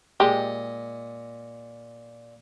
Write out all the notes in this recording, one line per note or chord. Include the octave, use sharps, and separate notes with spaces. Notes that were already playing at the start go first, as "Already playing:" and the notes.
A#2 G#3 G4 D#5